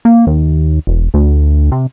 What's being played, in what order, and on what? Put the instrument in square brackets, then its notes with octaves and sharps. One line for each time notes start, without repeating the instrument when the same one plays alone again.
[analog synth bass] A#3
D#2
E1
D2
C3